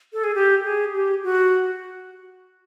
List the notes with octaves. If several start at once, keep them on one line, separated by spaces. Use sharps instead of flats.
A4
G#4
G4
G#4
G4
F#4